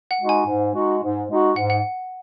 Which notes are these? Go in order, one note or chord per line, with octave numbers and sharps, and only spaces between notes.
F#5
G#3 D#4 F#4
G#5
G#2
G#3 D#4 F#4
G#2
G#3 D#4 F#4
G#2 F#5
F#5